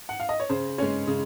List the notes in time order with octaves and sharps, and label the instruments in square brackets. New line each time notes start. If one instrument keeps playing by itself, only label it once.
[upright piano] F#5
F5
D#5
C#5
C#3 C5
G#3 C#4 C#5
C#3